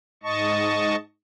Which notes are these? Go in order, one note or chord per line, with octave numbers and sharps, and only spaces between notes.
G#2 D#5 A5 C#6